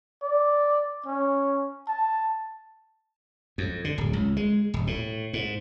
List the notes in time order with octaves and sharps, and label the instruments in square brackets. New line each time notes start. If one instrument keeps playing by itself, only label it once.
[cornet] D5
C#4
A5
[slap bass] F2
D3
D1
C#2
G#3
D#1
A2
G#2